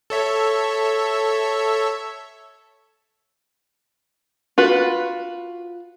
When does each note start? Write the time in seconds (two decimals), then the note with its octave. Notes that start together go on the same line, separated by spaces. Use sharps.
0.10 A4 C#5 E5
4.58 F4 F#4 B4